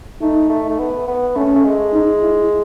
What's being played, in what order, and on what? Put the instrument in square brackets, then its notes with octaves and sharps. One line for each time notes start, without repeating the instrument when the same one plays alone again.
[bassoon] A3 [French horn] D#4
[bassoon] A3
A3
B3
B3
[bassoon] A3 [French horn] C#4
[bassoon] A3
G#3
[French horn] D#4
E4